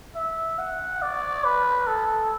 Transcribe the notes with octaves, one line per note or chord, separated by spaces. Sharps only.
E5
F#5
D5
B4
A4